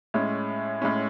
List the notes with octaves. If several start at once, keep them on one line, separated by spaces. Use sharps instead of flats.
A2 G#3 C#4
A2 G#3 C#4